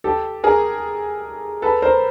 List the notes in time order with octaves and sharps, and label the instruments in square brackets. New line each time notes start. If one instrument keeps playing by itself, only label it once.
[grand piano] G4 A4
G#4 A#4
A4 B4
A#4 C5